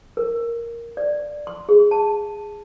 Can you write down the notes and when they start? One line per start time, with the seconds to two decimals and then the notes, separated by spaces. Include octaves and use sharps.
0.17 A#4
0.97 D5
1.47 C6
1.69 G#4
1.91 A5